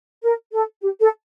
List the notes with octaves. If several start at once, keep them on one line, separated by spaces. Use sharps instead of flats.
A#4
A4
G4
A4